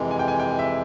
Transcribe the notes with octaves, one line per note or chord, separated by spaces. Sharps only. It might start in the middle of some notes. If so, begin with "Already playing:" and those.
Already playing: F2 C3 E3 G#3
G#5
G5
G#5
G5
E5